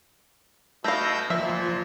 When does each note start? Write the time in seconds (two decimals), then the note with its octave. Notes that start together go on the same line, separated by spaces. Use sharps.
0.84 B2 A3 F5 E6 G6 A#6
1.30 A#2 F3 E5